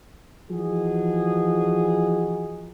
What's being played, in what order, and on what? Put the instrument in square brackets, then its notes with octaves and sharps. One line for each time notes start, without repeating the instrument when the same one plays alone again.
[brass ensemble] E3 F3 D#4 F#4 G#4